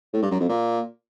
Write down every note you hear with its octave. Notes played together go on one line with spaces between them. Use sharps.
A2
G2
F#2
F2
A#2